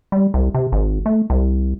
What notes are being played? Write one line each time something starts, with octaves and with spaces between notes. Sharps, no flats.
G3
C2
C3
G#1
A3
C2